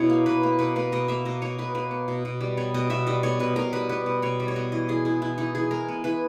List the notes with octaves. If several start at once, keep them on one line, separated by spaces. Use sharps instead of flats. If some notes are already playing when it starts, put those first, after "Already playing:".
Already playing: B2 E4 C#5
A#3
B2 B4
A#3
B2 B4
A#3 B4
B2 D#5
A#3 E5
B2 D#5
A#3 C#5
B2 B4
A#3 B4
B3
B2
B2
G3
B3 C#5
B2 D#5
B2 E5
G3 D#5
B3 C#5
B2 B4
B2 A#4
G3 B4
B3 B4
B2
B2 C#5
G3
C#5
B3 D#5
E3 D#5
E3 G#4
G#3 E4
B3 E4
E3 D#4
E3 G#4
G#3 A#4
B3
E3 B4